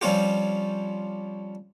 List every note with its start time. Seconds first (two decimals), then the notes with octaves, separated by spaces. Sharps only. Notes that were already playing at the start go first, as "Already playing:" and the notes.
0.01 F3 G3 C4 C#4 F4 G4